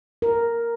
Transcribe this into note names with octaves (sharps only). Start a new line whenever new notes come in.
A#4